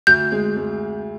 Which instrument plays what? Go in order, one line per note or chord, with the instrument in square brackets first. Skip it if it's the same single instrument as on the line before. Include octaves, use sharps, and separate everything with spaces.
[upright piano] D2 [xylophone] G6
[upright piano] G#3
G#3